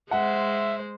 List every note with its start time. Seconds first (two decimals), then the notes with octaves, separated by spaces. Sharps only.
0.11 G#3 C5 E5 F#5